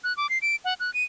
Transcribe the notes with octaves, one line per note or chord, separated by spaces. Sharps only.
F#6
D6
C7
D7
F#5
F#6
D#7